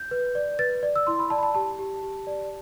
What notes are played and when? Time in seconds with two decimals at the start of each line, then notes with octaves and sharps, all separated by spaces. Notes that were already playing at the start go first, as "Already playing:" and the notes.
Already playing: G6
0.11 B4
0.35 D5
0.59 B4 A6
0.83 D5
0.96 E6
1.07 E4 C6
1.19 B5
1.30 D5 A5
1.38 B5
1.43 A5
1.54 G4 A5
1.79 G4
2.03 G4
2.27 D5